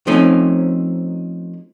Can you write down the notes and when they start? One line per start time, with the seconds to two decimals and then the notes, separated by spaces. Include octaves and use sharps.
0.07 F3 A3 C4 C#4 D#4